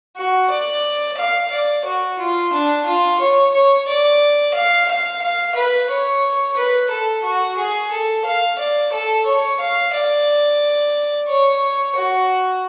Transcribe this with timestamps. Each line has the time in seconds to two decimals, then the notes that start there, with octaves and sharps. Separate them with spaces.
0.16 F#4
0.50 D5
1.17 F5
1.51 D5
1.85 F#4
2.19 F4
2.52 D4
2.86 F4
3.19 C#5
3.53 C#5
3.87 D5
4.54 F5
4.88 F5
5.22 F5
5.55 B4
5.89 C#5
6.56 B4
6.90 A4
7.23 F#4
7.57 G#4
7.91 A4
8.25 F5
8.58 D5
8.92 A4
9.26 C#5
9.59 F5
9.93 D5
11.28 C#5
11.96 F#4